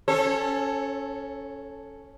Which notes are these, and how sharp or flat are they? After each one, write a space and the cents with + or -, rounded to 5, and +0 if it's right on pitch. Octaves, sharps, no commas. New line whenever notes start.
C#4 +0 A4 +0 C#5 -45